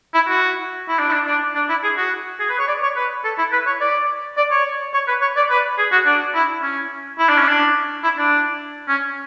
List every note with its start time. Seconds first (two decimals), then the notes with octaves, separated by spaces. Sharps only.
0.14 E4
0.28 F#4
0.89 E4
0.99 D4
1.09 E4
1.13 D4
1.27 D4
1.55 D4
1.69 E4
1.83 G#4
1.98 F#4
2.40 G#4
2.49 B4
2.59 C#5
2.68 D5
2.82 C#5
2.96 B4
3.24 A4
3.38 E4
3.52 B4
3.66 C#5
3.81 D5
4.37 D5
4.51 C#5
4.94 C#5
5.08 B4
5.22 C#5
5.36 D5
5.50 B4
5.78 G#4
5.92 F#4
6.06 D4
6.34 E4
6.62 C#4
7.19 E4
7.29 D4
7.38 C#4
7.48 D4
8.04 E4
8.18 D4
8.88 C#4